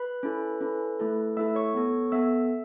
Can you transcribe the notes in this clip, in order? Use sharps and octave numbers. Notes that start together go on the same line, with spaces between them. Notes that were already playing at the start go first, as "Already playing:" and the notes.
Already playing: B4 B5
C#4 E4 A4
C#4 E4 A4
A3 E4 A4
A3 E4 A4 E5 E6
C#5 C#6
B3 A4
B3 A4 E5 E6